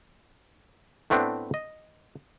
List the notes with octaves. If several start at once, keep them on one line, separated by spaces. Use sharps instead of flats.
A2 A3 B3 C4 D4
D#5